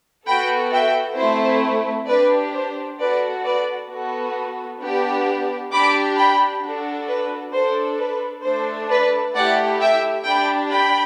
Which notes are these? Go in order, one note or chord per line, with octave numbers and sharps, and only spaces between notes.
B3 F#4 A4 G5 B5
E5 G5
A3 C4 E4 C5
D4 G4 B4 D5
C5
B3 F#4 A4 B4 D5
B4 D5
B3 F#4 A4
B3 D4 G4
D4 G4 B5 D6
G5 B5
D4 F#4 A4
B4
D4 A4 C5
B4
A3 D4 A4 C5
B4 D5
A3 E4 G4 D5 F#5
E5 G5
D4 G4 G5 B5
G5 B5